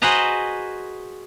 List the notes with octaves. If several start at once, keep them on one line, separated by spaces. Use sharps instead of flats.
F#4 G#4 B4 C5 D#5 A#5